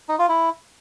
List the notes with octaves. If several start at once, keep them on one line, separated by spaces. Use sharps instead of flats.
D#4
F4
E4